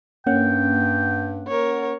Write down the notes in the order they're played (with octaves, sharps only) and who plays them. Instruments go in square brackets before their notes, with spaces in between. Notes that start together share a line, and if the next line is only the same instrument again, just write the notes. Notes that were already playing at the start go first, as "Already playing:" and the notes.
[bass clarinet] G2 [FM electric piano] A#3 C#4 F#5 [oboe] G5
[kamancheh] A#4 C#5